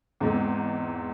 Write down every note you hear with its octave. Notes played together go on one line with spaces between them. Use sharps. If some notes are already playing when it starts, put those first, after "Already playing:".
E2 G#2 C4